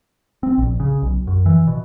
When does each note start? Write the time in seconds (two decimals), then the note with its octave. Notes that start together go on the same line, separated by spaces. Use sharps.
0.43 C4
0.58 A#1
0.80 C#3
1.02 B1
1.27 F#2
1.46 E3
1.67 B2